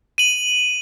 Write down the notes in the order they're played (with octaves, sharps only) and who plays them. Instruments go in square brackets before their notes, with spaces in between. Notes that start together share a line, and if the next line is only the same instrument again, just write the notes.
[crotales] D#7 F#7